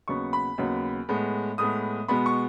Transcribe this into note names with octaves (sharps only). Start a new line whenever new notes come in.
D#2 C#3 F#3 B3 C#6
B5
D#2 C#3 F#3 B3
A2 G#3 B3
A2 G#3 B3 D#6
B2 G#3 B3 B5
C#6